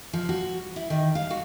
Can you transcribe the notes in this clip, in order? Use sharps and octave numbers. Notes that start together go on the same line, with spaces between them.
F3
F#4
E4
D#3
F5
F#4